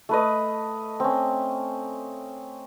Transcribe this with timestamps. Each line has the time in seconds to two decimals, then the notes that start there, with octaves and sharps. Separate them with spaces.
0.09 A3 B4 D#5
1.00 C4 C#4